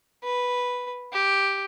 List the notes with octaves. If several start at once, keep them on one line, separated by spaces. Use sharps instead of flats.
B4
G4